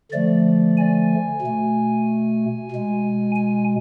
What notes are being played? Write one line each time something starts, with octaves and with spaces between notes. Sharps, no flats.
D3 F3 A3 D5
G#5
B2 A3
B2 G#3
G#5